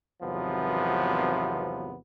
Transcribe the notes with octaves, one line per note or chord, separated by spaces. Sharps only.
G#1 E2 C3 F3 F#3 B3